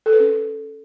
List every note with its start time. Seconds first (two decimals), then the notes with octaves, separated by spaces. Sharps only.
0.06 A4
0.13 B4
0.20 C#4